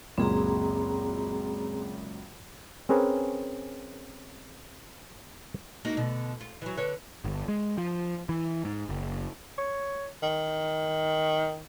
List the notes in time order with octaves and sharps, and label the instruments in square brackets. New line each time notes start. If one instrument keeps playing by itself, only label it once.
[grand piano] C#2 F#2 A#2 [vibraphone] C4 G#4 A#5
[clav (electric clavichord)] C4 C#4 G#4 A#4 B4
[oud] A#3 D#4 F#4
B2 D3
F4
E3 F#3
D3 B4 C#5
[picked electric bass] G1
G#3
F3
E3
G#2
F#1
[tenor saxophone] C#5
D#3